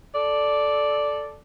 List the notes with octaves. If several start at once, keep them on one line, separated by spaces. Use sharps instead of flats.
A4 D5